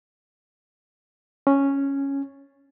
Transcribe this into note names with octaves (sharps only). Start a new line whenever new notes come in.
C#4